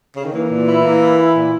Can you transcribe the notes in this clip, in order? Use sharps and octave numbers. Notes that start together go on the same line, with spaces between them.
C#3
D#3
E3 A#3
A#2
E4
A#3
E4
E4
A#2